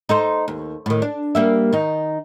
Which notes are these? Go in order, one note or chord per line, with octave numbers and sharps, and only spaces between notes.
D#4 A4 C5
D#2
A2 D#3
D4
G3 A#3 E5
D#3 D#4